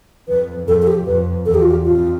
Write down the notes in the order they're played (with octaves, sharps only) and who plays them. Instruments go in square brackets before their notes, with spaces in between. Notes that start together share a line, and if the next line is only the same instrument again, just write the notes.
[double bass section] F2 [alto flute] B4
[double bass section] F2 [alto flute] A4
[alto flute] A4
G4
[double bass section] F2 [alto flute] B4
[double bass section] E2 [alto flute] A4
[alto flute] G4
F4
G4
[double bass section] F2 [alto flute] F4